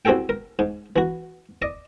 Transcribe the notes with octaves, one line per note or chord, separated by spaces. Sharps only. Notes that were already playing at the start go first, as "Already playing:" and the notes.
C2 C4 F#4 G#4 A4 G5
A#4
G#2
E3 F#4
D5 D#5